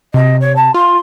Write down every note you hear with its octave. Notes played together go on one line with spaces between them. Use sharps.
C3 D#5
C#5
A5
F4 C6